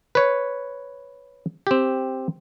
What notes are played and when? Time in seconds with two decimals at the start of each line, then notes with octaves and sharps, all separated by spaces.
0.15 B4 C#5
1.67 C4 G4